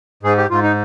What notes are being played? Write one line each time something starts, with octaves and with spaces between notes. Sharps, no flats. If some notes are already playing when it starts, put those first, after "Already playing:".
G#2 G#4
G4
G#2 F4
D#4